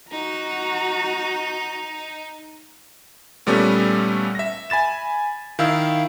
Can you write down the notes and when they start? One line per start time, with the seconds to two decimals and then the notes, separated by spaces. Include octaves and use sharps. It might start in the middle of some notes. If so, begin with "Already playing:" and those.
0.11 D#4 F#4 A#5
3.47 A#2 G3 A3 B3 C#4
4.35 E5 A#6
4.70 G#5 B5 A6 E7
5.59 D#3 E4 F5 E6